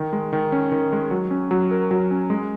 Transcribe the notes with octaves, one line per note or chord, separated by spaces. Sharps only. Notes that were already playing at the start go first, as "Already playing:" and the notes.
Already playing: D#3
G#3
D#3
C#4
D#3
G#3
F#3
C#4
F#3
A#4
F#3
C#4
G#3